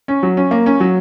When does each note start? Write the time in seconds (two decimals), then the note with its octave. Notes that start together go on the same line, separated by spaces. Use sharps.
0.08 C#4
0.23 F#3
0.37 C#4
0.51 A#3
0.66 C#4
0.80 F#3